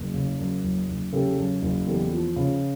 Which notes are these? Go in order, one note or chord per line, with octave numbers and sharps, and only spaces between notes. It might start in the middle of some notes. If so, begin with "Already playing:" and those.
Already playing: F#1
C#3
F#2
F#1
F#1
C#3 G4 A4
F#2
F#1
E2 G4 A4
F3
C#3